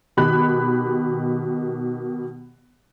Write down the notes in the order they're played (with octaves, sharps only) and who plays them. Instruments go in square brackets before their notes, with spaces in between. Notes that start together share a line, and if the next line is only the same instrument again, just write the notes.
[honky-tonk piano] B2 D#3 G4 B5 F#6